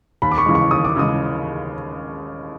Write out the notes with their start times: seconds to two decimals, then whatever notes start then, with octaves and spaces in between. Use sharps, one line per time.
0.22 D#2 B5
0.32 D6
0.38 C#6
0.46 C#3 E3 G#3
0.55 C#6
0.71 D#2 D#6
0.85 D6
0.96 C#3 E3 G#3 D#6